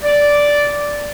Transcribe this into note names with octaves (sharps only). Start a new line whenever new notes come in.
D5